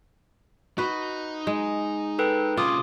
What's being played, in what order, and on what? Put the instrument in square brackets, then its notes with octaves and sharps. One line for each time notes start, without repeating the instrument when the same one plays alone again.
[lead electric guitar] D#4 D#5 [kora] F#4 B4
[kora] G#3
[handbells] A4 B4 G5
[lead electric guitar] C3 C#4 [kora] F4 [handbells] C6 D6 D#6